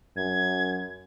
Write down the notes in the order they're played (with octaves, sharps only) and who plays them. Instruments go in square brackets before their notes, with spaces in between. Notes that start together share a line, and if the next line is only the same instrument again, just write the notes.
[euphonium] F#2 [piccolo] G#6